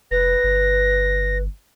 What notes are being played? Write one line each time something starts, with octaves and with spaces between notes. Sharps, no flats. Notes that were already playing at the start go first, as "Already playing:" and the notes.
F1 B4 A#6
G1